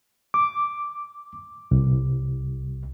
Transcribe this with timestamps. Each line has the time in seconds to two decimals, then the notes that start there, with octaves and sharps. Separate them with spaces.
0.34 D6
1.71 C2